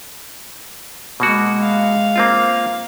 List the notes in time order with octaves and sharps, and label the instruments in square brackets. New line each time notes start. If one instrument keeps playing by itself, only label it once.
[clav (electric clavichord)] B2 A#3 F#4 [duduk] G#3
[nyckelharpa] F5
[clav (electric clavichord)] A#3 C4 F4